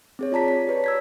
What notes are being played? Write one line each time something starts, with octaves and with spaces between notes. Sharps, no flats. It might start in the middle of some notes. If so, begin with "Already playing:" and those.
C4 G#4 C#5
F4 D5 A5 A#5 B6
B6
G4 B4 C#5
E6 G#6 B6